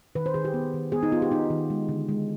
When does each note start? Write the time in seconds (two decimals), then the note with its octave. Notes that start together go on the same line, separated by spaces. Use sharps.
0.15 D#3 B4
0.26 C5
0.34 D#3 G#4
0.45 G4
0.54 B3
0.74 D#3
0.92 B3 G#4
1.03 D#4
1.12 B3 F4
1.22 G4
1.31 B3 D#4
1.50 D#3
1.70 G#3
1.89 D3
2.09 G#3